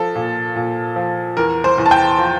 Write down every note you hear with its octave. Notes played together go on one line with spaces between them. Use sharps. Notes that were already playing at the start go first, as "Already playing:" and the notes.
Already playing: F3 A4
A#2
A#2
F3
E2 A#4
C5
E2
A5
G5
F3